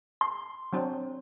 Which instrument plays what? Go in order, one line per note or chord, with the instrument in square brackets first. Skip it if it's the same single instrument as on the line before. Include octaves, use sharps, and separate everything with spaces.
[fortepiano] C6
[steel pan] F#3 C4 D4